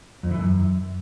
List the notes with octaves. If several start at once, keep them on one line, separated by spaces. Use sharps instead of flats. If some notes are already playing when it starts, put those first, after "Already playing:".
F2
E3
F#2